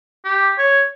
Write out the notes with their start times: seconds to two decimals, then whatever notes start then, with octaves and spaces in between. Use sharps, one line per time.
0.25 G4
0.58 C#5